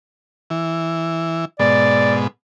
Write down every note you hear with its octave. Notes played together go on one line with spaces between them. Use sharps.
E3
G#2 B2 D5